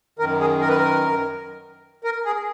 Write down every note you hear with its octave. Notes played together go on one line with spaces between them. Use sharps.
F#2 D#3 A#4
G#4
A#4
B4
A#4
A#4
G#4